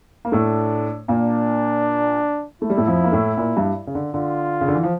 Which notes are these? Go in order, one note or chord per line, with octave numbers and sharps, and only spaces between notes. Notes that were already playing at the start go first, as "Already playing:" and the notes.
A#3
A2 A3 D4
A#2 A#3 D4
A3 E4
G3
A2 A3
F2 F3
A#3
A2 A3
A#2 A#3
G2 G3
C#3
D3
D3 F4
C#3
D3
E3
F3